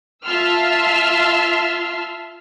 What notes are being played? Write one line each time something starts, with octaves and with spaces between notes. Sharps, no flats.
F4 E5 A5 C6 E6 F6